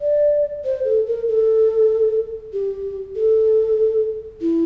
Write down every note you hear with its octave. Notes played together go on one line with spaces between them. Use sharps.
D5
C5
A4
A#4
A4
G4
A4
E4